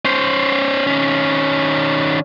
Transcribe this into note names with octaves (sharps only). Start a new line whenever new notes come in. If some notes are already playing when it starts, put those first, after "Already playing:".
C#4 C5
D#3 C#4